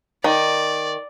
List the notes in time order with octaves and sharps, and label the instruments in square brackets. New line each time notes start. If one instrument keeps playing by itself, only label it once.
[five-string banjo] D#3 [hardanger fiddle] D5